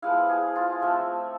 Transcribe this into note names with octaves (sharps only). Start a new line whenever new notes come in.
F3 G#3 B3 E4 F5
G#4
F4
F3 A3 C4 E5